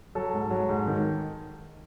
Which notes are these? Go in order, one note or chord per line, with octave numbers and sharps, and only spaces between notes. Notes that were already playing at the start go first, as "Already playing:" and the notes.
F#3 A4
G#2
F#3
G#2
D#3